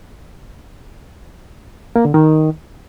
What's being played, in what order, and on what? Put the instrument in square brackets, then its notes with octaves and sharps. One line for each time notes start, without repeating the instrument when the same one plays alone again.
[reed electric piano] A#3
D3
D#3